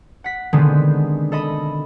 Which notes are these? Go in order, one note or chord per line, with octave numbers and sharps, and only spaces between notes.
F#5 B6
B2 D3 D#3 G#3 B3 C4
A4 D#5 B5